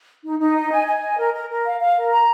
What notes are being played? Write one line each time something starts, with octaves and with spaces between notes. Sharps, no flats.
D#4
D#4
D#5
G#5
G#5
D#5
A#4
A#4
A#4
F5
F5
A#4
A#5